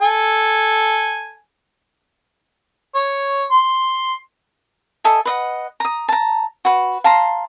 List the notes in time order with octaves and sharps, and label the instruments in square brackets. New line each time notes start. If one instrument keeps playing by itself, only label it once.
[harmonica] A4 G#5
C#5
C6
[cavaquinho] A4 D#5 E5 G#5
B4 D#5 F#5
A#5 D#6
A5 A#5
F#4 B4
F5 A5 A#5 C6